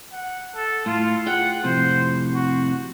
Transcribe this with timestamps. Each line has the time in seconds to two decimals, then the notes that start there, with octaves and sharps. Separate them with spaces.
0.12 F#5
0.55 A4
0.86 A2 F4
1.27 F4 G#4 F#5 G5
1.64 F2 A2 C3 C5
2.34 F#4